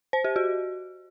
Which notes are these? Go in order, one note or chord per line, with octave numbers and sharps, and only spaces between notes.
C5
G4
F#4